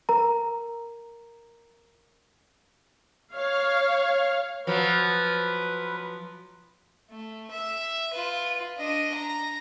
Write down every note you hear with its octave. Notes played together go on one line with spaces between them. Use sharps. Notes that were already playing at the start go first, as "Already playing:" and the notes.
A#4 A#5
C#5 F5
F3 F#3 B4
A3
E5
F4 B4
D4 D#5
A#5